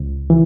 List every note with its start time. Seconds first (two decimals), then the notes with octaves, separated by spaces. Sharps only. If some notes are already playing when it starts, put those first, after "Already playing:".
Already playing: C#2
0.30 E3